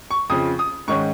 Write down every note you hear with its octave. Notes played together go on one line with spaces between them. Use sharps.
C#6
F2 C#3 F3 D#6
D#6
G#2 D#3 C#4 C#6